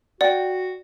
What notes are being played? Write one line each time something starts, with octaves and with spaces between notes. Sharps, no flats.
F#4 D5 F#5 G5